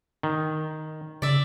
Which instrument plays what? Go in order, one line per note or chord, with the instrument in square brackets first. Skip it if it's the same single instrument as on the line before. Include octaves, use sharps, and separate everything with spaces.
[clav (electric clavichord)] D#3
[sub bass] C#3 [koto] D5 E5